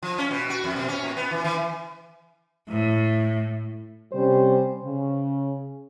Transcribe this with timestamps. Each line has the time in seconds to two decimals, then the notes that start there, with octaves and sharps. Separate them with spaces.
0.03 F3
0.18 C#4
0.31 B2
0.50 F#4
0.64 F2
0.76 B2
0.89 C#4
1.04 A#2
1.17 B3
1.31 E3
1.44 E3
2.69 A2
4.13 C3 G3 C#4 C5
4.83 C#3